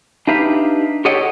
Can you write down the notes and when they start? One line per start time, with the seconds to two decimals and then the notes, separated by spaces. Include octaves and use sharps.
0.27 D4 D#4 G4 B4 E5 F5
1.05 G4 A4 C#5 D#5 F#5 G5